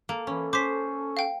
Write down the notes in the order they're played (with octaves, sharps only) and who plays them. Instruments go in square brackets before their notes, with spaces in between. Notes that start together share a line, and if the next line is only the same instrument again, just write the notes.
[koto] A#3 [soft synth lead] A4
[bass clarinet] E3 [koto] C#4
[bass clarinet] C#4 [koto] C5 [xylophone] D6 B6
[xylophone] F5 G5